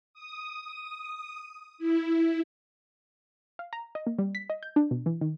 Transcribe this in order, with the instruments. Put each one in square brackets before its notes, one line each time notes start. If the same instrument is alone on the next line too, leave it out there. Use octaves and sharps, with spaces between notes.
[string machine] D#6
E4
[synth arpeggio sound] F5
A#5
D#5
A#3
G3
B6
D#5
G6
D4
B2
E3
D#3